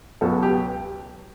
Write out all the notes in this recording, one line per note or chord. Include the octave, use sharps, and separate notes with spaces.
C#2 B2 F#3 A4
G4